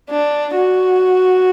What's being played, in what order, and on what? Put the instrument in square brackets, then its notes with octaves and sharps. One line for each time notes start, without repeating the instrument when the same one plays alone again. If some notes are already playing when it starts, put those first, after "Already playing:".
[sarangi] D4
F#4